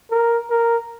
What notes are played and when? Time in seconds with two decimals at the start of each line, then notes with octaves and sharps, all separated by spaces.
0.11 A#4
0.50 A#4